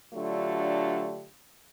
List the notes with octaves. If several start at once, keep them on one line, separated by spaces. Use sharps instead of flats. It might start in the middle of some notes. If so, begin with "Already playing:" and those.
D3 F#3 A3 D4 F4 G4